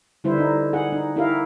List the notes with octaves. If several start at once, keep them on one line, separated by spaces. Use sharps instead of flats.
D3 G3 E4 B4 C5
D#4
G#4 F#5
D#4
D#4 E4 G4 A#4 F5